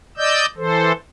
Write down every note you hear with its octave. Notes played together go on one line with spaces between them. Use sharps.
D5 D#5 E6 G6
E3 A4 C5